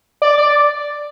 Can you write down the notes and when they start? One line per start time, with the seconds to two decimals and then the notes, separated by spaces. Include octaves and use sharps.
0.22 D5
0.38 D5